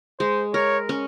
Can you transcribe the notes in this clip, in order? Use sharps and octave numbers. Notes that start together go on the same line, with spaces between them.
G#3 C5
A#4 C#5
C#4